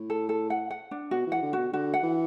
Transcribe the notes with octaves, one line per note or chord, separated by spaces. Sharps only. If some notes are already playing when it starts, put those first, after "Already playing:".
Already playing: A2
A4
A4
F#5
F#5
D4
B2 F#4
E3 F#5
D3
B2 F#4
D3 F#4
F#5
E3